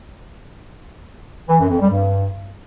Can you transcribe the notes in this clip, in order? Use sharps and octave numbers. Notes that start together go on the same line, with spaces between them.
E3
F#2
F2
G3
G2